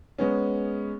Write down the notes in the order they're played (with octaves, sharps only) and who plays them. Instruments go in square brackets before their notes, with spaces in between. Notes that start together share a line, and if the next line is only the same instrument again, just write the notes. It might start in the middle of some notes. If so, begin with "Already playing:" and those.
[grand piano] G#3 B3 C#4